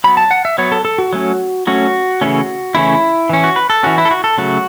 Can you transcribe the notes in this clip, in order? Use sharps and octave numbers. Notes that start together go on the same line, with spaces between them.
F#3 B3 B5
A5
F#5
E5
F#3 B3 C#5
A4
A4
F#4
F#3 A3 C#4
F#3 A3 C#4 F#4
C#3 E3 A3 C#4
C#3 E3 A3 C#4 E4
E3 C#4
F#4
B4
A4
E3 C#4 F#4
E4
A4
F#4
A4
C#3 F#3 A3 F#4